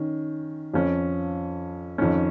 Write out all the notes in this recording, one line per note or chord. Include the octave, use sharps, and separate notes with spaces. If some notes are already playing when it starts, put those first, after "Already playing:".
Already playing: D#3 C#4
F2 F3 C#4
F2 D#3 C#4